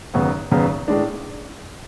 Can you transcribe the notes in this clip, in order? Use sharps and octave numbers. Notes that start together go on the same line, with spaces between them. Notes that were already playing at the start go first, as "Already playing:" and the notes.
G#1 F#2 C#3 F#3 B3
G#1 F#2 C#3 F#3 B3
A2 G#3 D4